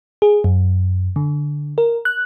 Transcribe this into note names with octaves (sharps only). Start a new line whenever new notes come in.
G#4
F#2
D3
A#4
F#6